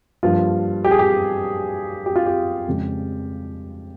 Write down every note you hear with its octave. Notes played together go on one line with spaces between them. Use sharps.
G2 F3 A#3 F4
G4
G#4
G4
G4
F4
G4
F2 C#3 G#3